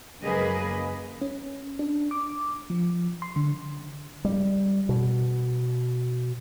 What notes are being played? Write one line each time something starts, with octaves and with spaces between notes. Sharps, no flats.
F#2 C#3 A#3 G#4 B4 D#5
C#4
D4
D6
F3
C6
D3
G3
B2